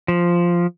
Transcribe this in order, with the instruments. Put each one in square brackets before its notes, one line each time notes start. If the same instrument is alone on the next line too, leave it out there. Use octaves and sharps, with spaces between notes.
[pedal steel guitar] F3